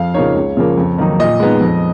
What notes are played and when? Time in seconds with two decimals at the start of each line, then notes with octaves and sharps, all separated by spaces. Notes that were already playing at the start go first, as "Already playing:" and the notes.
Already playing: F2 F5
0.14 C#3 F3 A#3 D#4 C#5
0.35 C#2
0.57 C#3 F3 A#3
0.78 F2
0.98 D#3 F#3 A#3 D#4
1.19 A#2 D#5
1.40 G#3 B3 D#4
1.61 F2